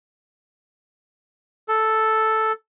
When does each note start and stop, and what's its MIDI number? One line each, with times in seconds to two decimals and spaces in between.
1.68 2.52 69